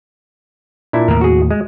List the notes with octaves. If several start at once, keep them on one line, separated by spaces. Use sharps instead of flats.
A#2 D4 E4
D#2 A2 A#3 A#4
F#4 G#4
G#3